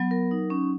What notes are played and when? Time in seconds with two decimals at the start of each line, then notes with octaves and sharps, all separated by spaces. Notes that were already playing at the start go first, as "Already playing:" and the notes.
Already playing: F#3 B3
0.11 A#4
0.31 D#4
0.50 C#4